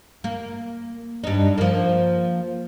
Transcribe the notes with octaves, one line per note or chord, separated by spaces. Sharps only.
A#3
G2 D#4
F3 A#3